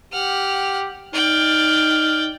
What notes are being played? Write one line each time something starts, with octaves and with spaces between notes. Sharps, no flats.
G4 F#5 F6
D#4 D5 G5 F6